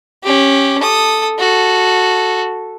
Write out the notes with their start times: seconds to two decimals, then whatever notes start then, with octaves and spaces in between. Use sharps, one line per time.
0.23 C#4 G4
0.80 A4 D#6
1.39 F#4 A4